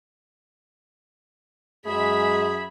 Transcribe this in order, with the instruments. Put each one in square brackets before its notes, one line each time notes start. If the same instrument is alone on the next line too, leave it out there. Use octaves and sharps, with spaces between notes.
[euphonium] F#2 [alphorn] G#3 [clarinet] G#4 [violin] E5 B5